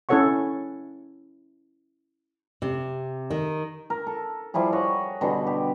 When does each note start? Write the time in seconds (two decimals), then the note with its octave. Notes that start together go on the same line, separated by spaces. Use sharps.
0.09 C#4 E4 A4 C#5 F#5 C#6
2.62 C3
3.30 D#3
3.90 A#4
4.07 A4
4.54 F3 G3 E4 G#4
4.73 C#5 D#5 F#5
5.21 B2 D3 G3 G#4
5.47 G4